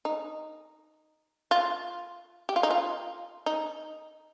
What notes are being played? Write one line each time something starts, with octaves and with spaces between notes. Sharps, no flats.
D#4
F4
G4
F4
D#4
F4
D#4